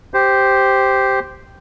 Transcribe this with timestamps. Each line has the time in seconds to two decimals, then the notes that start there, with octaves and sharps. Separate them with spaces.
0.14 G4 C5